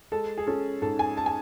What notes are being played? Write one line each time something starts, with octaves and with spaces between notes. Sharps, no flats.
G#3 A4
G#4
C#4 A4
G#2 A4
G#5
A5
G#5